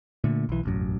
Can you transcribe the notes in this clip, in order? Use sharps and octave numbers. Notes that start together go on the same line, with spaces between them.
A#2 D3 A3
B1 E3
E1 A1 F#2